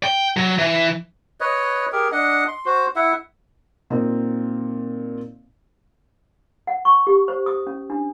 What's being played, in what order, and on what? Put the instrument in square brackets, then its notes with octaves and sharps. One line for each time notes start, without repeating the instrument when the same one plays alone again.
[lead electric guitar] G5
F#3
E3
[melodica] B4 C#5 D#5
G4 G#4 A#4
D4 D#5 F#5
C6
F#4 C5
E4 E5 F#5
[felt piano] A#2 C4 D#4 D#5
[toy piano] F#5
C#6
G4
C5
D#6
C#4
D4